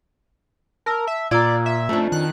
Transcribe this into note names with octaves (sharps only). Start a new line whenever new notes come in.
A#4 A5 E6
E5
A#2 F4 D5 A#5 E6 G#6
E5
F2 A3 C#4 D4
D#3 F#6